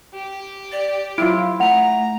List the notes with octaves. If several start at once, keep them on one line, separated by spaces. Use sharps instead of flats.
G4
D5
F#3 E4 F4 D7
A3 F#5 A#5 F7